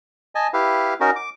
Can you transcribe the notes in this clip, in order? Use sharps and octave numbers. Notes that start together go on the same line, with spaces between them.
D#5 G#5 A5
E4 G4 B4 F5
C#4 D#4 F#4 A#4
D6